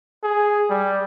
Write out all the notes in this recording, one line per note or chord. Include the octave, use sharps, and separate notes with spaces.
G#4
G3